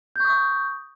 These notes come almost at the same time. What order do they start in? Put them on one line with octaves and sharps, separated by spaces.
G6 C#6 D#6